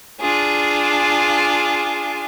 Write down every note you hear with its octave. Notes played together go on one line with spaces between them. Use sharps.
D4 F4 G#4